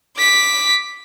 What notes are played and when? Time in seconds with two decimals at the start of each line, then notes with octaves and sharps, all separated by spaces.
0.17 D6 B6